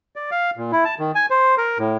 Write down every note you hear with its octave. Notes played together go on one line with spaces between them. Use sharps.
D5
F5
A#2
E4
A5
D#3
G#5
C5
A#4
A2